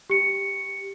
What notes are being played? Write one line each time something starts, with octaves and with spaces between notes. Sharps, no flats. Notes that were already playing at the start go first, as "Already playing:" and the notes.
G4 C#7